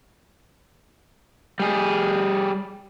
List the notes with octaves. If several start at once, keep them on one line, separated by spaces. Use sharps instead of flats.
G3 G#4